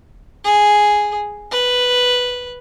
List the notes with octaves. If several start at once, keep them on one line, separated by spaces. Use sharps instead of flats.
G#4
B4